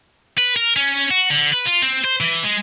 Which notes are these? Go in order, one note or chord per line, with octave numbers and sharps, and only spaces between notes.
B4
A#4
C#4
F#4
D3
B4
F4
C4
C5
E3
G#3